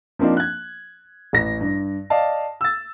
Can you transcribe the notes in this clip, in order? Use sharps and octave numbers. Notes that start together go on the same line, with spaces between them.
F3 A#3 C4 D4 D#4
F#6 G#6
A1 A#6
G2
D5 D#5 F5 A5
E6 A6